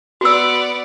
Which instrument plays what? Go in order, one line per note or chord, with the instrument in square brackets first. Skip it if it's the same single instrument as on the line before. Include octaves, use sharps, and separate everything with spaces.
[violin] B3 D5 [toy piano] F#4 E6